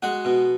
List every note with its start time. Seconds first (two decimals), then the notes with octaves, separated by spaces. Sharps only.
0.02 G#3 F#4 F#5
0.25 B2